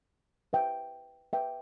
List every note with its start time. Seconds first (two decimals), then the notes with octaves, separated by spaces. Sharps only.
0.53 B4 E5 G5
1.33 B4 E5 G5